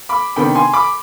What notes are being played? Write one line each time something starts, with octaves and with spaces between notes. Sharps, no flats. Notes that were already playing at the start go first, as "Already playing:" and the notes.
B5 D6
C3 D#3 B3 D4 G5 B5
G#5 C6
B5 D6